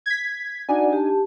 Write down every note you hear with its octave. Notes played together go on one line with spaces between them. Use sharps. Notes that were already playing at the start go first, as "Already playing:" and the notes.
G#6 B6
D4 D#4 F#4 D5 F#5 G#5
G4 A5